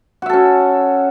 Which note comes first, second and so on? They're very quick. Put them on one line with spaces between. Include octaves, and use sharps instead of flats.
F#4 E5 A4 C#4